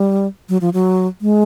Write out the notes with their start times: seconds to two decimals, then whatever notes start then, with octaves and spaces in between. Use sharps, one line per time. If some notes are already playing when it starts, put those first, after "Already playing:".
Already playing: G3
0.49 F#3
0.61 F3
0.73 F#3
1.21 G#3